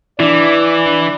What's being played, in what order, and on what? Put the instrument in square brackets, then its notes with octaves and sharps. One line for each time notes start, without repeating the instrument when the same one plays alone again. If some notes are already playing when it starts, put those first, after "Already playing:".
[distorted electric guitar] E3 [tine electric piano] D4 E4 [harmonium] D5